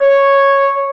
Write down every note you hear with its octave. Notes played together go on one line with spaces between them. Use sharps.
C#5